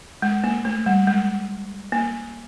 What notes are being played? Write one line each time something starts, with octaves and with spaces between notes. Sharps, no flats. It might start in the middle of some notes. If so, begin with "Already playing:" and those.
G#3
A#3
A3
G3
G#3
A#3